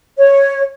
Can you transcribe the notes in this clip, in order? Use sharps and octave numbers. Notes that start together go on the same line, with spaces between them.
C#5